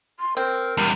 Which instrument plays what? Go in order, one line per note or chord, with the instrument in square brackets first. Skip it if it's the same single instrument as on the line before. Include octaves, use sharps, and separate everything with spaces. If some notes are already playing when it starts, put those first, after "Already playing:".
[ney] C6
[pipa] C4 [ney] A#4
[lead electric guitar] E2 G3